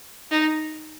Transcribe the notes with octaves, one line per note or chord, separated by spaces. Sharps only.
D#4